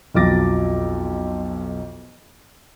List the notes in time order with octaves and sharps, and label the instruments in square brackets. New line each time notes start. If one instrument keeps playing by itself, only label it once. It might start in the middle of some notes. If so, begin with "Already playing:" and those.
[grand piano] B1 F2 F#3 D6 A6 A#6